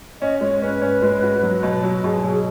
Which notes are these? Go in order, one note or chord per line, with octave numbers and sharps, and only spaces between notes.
C#4 D#5
G#3 C#5
C#4 B4
C#4
G#3
F#4
F#3
B2
F#3
B2 G#4
F#3
G#4